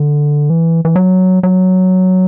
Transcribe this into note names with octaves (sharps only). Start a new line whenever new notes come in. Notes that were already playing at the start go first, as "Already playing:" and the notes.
Already playing: D3
E3
E3
F#3
F#3